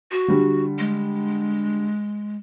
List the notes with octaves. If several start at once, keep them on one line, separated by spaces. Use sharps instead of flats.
F#4
D3 G3
G#3